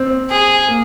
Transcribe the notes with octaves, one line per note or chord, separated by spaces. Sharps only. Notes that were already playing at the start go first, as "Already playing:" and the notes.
Already playing: C4
G#4
A#3